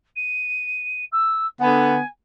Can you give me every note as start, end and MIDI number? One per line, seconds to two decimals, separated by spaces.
0.16 1.04 99
1.12 1.46 88
1.61 1.99 50
1.61 1.99 59
1.61 2.06 80